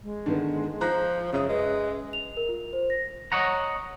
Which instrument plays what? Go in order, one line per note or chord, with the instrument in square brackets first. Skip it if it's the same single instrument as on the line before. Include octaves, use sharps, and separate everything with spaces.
[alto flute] G#3
[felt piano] D3 D#3 B3
[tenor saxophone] F3 [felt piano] A#5 F#6 A#6
[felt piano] F#2 D#6 [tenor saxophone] C#3
[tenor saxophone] G#3 [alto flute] B4
[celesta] F7
A#4
F4
C5
A#6
[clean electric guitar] C#5 D#5 F#5 A#5